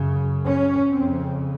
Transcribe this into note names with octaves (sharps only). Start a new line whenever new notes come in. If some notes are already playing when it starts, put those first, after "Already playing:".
Already playing: F#2 C#3
C#4
F2 C#3 C4